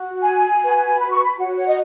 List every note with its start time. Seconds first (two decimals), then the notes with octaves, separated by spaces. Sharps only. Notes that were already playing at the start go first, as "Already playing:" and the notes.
Already playing: F#4
0.22 G#5
0.61 F#4 B4
0.99 B5
1.12 C#6
1.25 B5
1.38 F#4 C#5 F#5
1.57 C#5
1.67 D#5